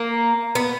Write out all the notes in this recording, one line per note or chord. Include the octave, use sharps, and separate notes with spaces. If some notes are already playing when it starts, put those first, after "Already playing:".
Already playing: A#3
B3